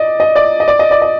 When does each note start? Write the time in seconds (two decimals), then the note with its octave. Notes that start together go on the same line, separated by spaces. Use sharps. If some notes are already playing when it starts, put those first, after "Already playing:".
Already playing: D5 D#5
0.20 D#5
0.36 D5
0.60 D#5
0.68 D5
0.79 D#5
0.91 D5
1.02 D#5